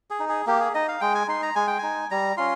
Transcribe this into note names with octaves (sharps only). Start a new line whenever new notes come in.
G#4
D#4
G#4
A#3 G4
G#4
D#4 D#5
F5
G#3 G5
G#5
D#4 C6
A#5
G#3 G#5
G5
D#4 G#5
G3 A#5
C#4 F4 C6